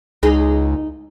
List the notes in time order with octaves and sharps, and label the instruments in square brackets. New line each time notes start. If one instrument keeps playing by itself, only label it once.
[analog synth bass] C#2 [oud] D#4 G#4